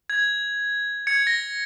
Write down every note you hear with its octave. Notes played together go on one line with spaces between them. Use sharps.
G#6
G#6 C#7
A#6